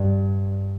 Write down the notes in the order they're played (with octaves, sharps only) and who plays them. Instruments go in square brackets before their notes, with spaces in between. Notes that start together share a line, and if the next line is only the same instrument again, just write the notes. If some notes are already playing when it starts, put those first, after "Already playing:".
Already playing: [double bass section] G2